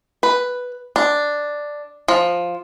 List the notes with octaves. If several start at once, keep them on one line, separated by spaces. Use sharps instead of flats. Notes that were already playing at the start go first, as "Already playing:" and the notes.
B4
D4
F3